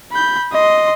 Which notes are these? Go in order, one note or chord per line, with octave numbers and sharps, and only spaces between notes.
B5 G6
D#5 C6